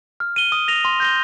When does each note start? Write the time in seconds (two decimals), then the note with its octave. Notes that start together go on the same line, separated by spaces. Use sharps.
0.20 F6
0.36 D#7 G7
0.52 D#6
0.68 A#6 F7
0.85 C6
1.00 G6 A#6 G7